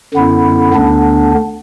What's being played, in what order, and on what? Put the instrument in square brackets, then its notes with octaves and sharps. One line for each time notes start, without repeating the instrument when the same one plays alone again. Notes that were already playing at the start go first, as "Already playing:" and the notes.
[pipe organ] F#2 D3 B3 E4
D2 D3 B3 D4